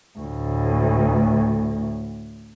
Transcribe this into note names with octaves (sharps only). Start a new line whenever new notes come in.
D2 A2